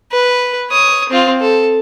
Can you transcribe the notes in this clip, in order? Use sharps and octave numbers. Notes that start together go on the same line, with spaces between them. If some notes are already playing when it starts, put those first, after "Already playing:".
B4
C#5 D#6
C4 F4
A4